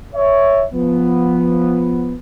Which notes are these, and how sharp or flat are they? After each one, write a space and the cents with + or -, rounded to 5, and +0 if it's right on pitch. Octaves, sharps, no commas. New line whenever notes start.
C#5 +5 E5 +0
F3 +0 B3 +0